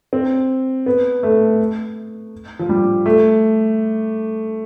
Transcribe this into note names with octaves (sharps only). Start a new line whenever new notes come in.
C4
B3
A3
F3
G3
A3